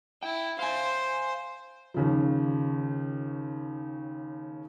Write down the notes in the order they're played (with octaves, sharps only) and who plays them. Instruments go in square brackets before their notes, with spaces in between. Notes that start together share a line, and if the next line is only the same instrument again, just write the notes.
[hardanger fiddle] E4 [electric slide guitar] G5
[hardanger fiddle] C5 [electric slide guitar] F5 G#5
[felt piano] D#2 C#3 F3